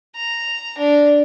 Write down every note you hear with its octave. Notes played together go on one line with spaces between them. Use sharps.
A#5
D4